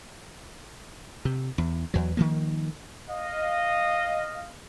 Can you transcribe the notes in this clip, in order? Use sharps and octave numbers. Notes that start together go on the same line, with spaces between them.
C3
E2
E2 F#3
D#3 F3 A#3
D#5 F5